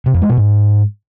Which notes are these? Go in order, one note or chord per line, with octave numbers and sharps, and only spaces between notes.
C3
F2
G#3
B2
G#2